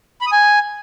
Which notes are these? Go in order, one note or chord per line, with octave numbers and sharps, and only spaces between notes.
B5
D#6
G#5